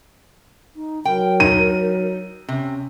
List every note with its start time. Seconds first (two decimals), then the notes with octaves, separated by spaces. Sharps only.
0.76 D#4
1.05 F#3 A#4 G5
1.40 D#4 D#7
2.49 C3 C#4